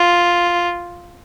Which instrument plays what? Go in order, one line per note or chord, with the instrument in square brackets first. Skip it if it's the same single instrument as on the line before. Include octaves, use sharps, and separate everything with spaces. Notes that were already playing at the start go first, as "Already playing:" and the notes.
Already playing: [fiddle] F4